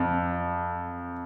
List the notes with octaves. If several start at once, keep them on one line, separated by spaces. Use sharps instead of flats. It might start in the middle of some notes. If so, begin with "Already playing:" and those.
Already playing: F2